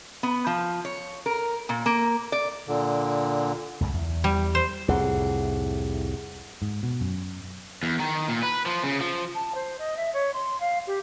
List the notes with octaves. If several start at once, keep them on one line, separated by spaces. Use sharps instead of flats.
B3
F3
C#5
A#4
A#2
A#3
D5
A#2 D3
C#2 F#2
E2
G3
C5
C2 F2 A2 G#4 F#5
G#2
B2
F#2
E2
D#3
A#2
B4
F3
C#3
F3
A5
C5
D#5
E5
C#5
C6
F5
G4